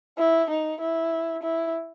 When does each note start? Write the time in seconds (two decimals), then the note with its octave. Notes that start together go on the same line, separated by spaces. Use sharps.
0.18 E4
0.50 D#4
0.80 E4
1.43 E4